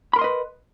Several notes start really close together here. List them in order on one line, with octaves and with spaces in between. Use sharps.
B5 A#4 C6 D#5 B4